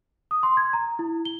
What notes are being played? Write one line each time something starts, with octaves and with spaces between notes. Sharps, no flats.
D#6
C6
G#6
A#5
E4
G7